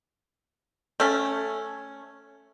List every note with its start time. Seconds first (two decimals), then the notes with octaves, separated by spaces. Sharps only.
1.00 A3 C#4